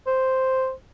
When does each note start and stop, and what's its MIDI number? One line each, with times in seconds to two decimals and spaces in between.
0.06 0.72 72